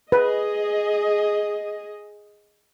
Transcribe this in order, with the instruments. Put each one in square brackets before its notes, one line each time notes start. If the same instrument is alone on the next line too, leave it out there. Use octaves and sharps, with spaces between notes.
[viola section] G#4 D#5 [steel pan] B4